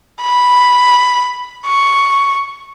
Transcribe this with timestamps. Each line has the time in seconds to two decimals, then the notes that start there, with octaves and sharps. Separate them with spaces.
0.22 B5
1.67 C#6